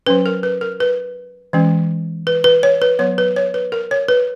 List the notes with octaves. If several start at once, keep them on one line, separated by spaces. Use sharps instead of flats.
F#3 C#4 B4
A#4
B4
A#4
B4
E3 G#3 C#4
B4
B4
C#5
B4
F#3 B3 C#5
B4
C#5
B4
A#4
C#5
B4